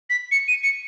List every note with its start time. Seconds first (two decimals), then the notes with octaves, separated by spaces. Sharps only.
0.10 B6
0.32 C#7
0.48 D#7
0.63 C#7